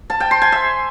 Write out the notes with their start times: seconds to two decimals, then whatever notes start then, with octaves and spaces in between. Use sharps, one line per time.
0.10 A5
0.20 G5
0.31 C6
0.42 G#5
0.52 E5